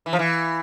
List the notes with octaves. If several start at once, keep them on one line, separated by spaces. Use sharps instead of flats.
E3
F3
E3